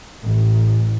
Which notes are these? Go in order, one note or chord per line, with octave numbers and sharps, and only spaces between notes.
A1